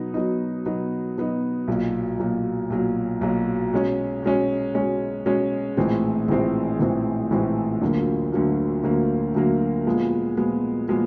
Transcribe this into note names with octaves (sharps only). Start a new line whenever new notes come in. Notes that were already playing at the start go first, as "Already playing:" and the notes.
Already playing: B2 F#3 B3 D#4
B2 F#3 B3 D#4
B2 F#3 B3 D#4
B2 F#3 B3 D#4
B1 A#2 F#3
B1 A#2 F#3
B1 A#2 F#3
B1 A#2 F#3
B2 G#3 C#4
B2 G#3 C#4
B2 G#3 C#4
B2 G#3 C#4
A#1 A2 E3 G#3 C4
A#1 A2 E3 G#3 C4
A#1 A2 E3 G#3 C4
A#1 A2 E3 G#3 C4
D2 D3 F#3 A#3
D2 D3 F#3 A#3
D2 D3 F#3 A#3
D2 D3 F#3 A#3
A#2 F3 G#3 B3
A#2 F3 G#3 B3
A#2 F3 G#3 B3